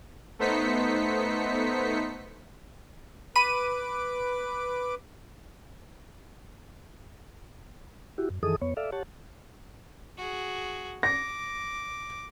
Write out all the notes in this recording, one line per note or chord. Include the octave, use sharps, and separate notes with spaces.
A3 B3 D#4 C5 B6 C#7
B4 B5 D6 D#7
E4 F#4 G4
F#2
F#2 D#3 E3 G#4 A4 D#6
F2 B3 C#5
A4 D5 E5 F5
G4 C#5 F#5 A5
F#4 G#4
D6 A#6